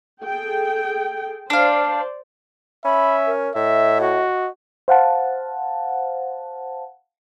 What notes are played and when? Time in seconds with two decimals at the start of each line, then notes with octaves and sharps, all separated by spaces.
0.23 G#4 A4 G5
1.50 D4 C5 D5 F5
2.85 C#4 E5 B5
3.27 A#4
3.55 A2 D#5 E5
4.01 F#4
4.88 C5 F5 F#5 A5